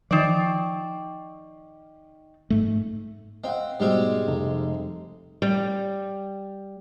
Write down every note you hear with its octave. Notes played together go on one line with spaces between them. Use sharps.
D#3 F3 D5
G#2 A3
C4 D#5 F5 F#5
G#2 B2 G3 G#3 C4
F1
G3